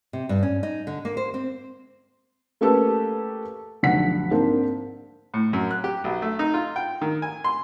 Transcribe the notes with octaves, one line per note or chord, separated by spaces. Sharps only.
C3
G2
C#4
D#4
D3
A#3
C5
C4
A3 A#3 C#4 G4 A4 B4
F1 B1 D3 F#5 B6
G#2 A#3 C4 D4
A2
F#2
F#6
G4
B1
A3
D#4
F4
G5
D#3
G#5
C6